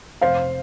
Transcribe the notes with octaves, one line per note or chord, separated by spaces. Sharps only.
F1 C5 F5